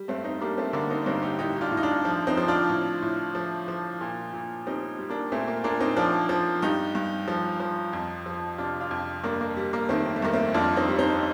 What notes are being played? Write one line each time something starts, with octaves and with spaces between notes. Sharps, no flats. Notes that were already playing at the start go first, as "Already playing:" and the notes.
Already playing: G3
G2 A3 C4
C4 D#4
G3 A#3 D4
A3 C4
D3 A#3 D4
C4 D#4
D4
G2 C4 D#4
D#4 G4
A2 D#4 G4
G4
D4 F4
A2
D#4
D4 F4
F3
C4 D#4
F3
D4 F4
A2
A2
F3
F3
A#2
A#2
G3 C4 D#4
G3
A#3 D4
A#2 A3 C4
A#3
A#2 A#3 D4
C4 D#4
F3 D4 F4
F3
G2 D#4 G4
G2
F3
F3
F2
F3
C3 D4 F4
D4 F4
F2
G2 A#3 D4
A#3
G3
A#3
D#3 A3 C4
A3
G2 A#3
A3 C4
F2 D4 F4
C4 D#4
G3
C4 D#4